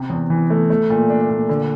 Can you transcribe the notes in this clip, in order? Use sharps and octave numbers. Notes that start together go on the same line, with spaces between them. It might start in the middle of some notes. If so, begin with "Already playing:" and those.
Already playing: C3
E2
E3
A3
A3
A#2
D4
A#2
D3